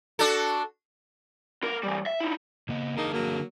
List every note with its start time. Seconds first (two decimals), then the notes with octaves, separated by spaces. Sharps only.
0.19 D4 F#4 A4
1.63 B3 A#4
1.83 E3 G3
2.06 E5
2.20 D#4 E4
2.69 C#3 A#3 D#5
2.97 D3 A#3 D#4 G#4 A#4 A5
3.12 F#3 A#3